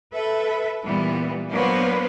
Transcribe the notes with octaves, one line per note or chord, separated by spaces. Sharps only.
A4 B4 E5
A#2 E3 G3 B3
F#3 A#3 B3 D4 B4 C5